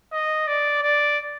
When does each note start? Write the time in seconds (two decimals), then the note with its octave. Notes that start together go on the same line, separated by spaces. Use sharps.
0.13 D#5
0.47 D5
0.82 D5